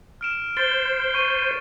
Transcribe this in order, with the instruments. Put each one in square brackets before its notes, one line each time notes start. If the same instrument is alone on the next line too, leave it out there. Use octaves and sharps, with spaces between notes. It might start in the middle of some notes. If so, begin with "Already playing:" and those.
[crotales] F6 D7 E7
[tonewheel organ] C5 [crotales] A6 G7
[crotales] C#6 D#7